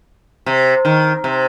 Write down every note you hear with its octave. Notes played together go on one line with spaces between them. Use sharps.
C3
D#3
C3